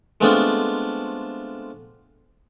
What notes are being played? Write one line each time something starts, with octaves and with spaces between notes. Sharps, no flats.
G#3 A3 B3 C4 D4 F4